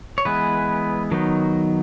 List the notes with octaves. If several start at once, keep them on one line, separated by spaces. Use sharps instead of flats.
C#5
E3 G#3 B3 B4
D#3 F#3 B3 D#4